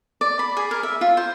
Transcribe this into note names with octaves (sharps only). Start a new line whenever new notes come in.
D5
B5
G#4
A#4
E5
F4
C5